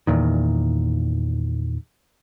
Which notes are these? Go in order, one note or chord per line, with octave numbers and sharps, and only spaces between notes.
E2 A#2 D#3